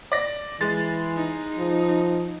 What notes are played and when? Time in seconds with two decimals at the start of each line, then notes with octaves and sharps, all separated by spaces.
0.12 D5 A#6
0.61 E3 G#3 A6
1.16 D#4
1.58 F3